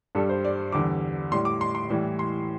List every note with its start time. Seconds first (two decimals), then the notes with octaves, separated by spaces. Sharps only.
0.15 G2 G3 A4
0.29 C5
0.45 D5
0.72 E2 D3 G3 D6
1.32 A2 G3 C6
1.45 D6
1.61 C6
1.75 C6
1.90 A2 E3 G3
2.19 C6